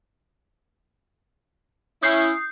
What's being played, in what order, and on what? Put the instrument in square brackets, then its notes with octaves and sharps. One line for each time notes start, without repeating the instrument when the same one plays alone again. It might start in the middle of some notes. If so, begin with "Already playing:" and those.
[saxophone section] C#4 E4 [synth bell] D#6 G6 C7